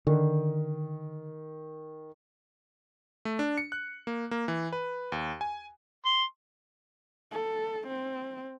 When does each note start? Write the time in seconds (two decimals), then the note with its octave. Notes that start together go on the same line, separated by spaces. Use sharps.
0.07 D3 D#3
3.25 A3
3.39 D4
3.58 C#7
3.72 F#6
4.07 A#3
4.31 A#3
4.48 E3
4.72 B4
5.12 D#2
5.41 G#5
6.06 C6
7.32 A4
7.88 C4